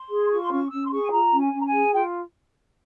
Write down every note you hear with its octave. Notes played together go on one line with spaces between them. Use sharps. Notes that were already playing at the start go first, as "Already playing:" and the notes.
Already playing: C6
G#4
F4 C#6
C6
C#4 C#6
C#4 E6
C6
G#4 C#6
G#5
F4 A#5
C#4
G#5
C#4
A#5
G#5
G#4
F4 G5